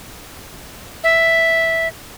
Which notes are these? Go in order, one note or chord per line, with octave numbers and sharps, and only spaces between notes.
E5